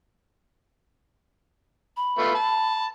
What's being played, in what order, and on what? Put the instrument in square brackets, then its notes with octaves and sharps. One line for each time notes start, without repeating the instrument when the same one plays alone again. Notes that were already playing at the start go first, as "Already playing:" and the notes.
[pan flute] B5
[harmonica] A3 B3 F4
A5